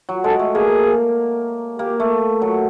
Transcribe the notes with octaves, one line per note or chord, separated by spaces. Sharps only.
F#3
G#3 A4
A3
A#3 G#4
A#3 G4
A3
F#3